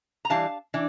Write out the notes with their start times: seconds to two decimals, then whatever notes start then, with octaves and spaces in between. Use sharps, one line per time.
0.25 A#5
0.30 E3 G3 D4 F5 A5
0.74 E3 D4